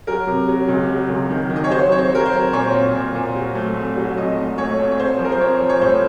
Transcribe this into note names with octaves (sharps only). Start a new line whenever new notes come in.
F#3 A#4
C3
F#3
C#2
F#3
C#2
D#3
D#3
D#5
C#5
F#3 C5
C4 C#5
C5
F#3 A#4
C5
C4
A#2 C#5
C4
A#2
A#2
F#3
A3
C2
F#3
C2 D#5
A3
A3 C#5
C2
C#5
C4 C5
F3
A#4
C5
C4 C#5
F3
C#5
A2 C5